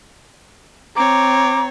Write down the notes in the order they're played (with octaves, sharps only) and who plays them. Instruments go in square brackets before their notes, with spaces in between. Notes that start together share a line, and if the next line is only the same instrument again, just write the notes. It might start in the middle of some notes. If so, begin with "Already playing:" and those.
[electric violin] C4 C#5 [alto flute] A#5 [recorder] D6